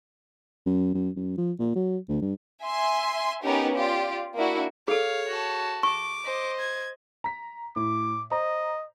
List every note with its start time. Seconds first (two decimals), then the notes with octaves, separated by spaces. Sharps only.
0.66 F#2
0.94 F#2
1.16 F#2
1.38 F3
1.59 A#2
1.76 F#3
2.08 D2
2.22 G2
2.63 E5 G#5 C6
3.43 B3 C#4 D#4 G4 A#4
3.75 F4 G4 D5
4.35 A#3 D4 E4 F#4
4.88 G#4 A4 C#5 F5
5.29 F#4 A5
5.83 C#6 D6
6.24 C5 D#5
6.59 G#6
7.24 A#5 B6
7.76 A2 D6
8.31 C5 D#5 A#5